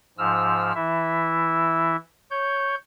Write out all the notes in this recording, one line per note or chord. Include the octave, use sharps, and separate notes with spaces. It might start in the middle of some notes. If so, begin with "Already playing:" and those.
G#2 F3 E6 F6
E3 E4 E5
C#5 G6